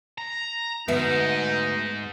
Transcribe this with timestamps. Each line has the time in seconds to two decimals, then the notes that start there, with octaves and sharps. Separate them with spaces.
0.18 A#5
0.88 D2 G#2 B3 D#4 E5